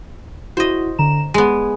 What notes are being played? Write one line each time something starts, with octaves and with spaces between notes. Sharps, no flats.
E4 F#4 C5 D#5
D3 A#5 E7
G#3 B3 G#5